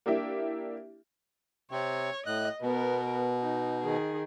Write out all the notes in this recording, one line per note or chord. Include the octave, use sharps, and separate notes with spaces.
A#3 D4 E4 G4 E5
C3 C4 C#5
A2 D#5 F#6
B2 B3 A#4
D#4
D#3 G#4